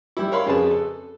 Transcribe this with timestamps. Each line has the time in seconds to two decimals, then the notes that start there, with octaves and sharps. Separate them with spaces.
0.17 G3 E4
0.32 A#4 C#5 F5 B5 C6
0.46 F2 C#3 G#4 B4 A5
0.71 A4